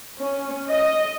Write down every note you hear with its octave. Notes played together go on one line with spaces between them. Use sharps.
C#4
D#5